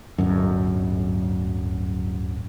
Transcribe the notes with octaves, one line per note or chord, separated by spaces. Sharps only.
D1 G1 F#2